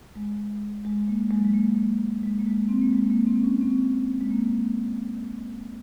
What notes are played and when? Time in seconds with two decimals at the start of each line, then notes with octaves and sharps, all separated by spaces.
0.16 G#3
0.85 G#3
1.08 A#3
1.31 G#3
1.37 F#3
1.45 G#3
1.54 A#3
2.23 G#3
2.39 A#3
2.46 G#3
2.69 C4
2.82 A#3
2.93 G#3
3.10 A#3
3.27 C4
3.44 C#4
3.61 C4
4.21 G#3
4.30 A#3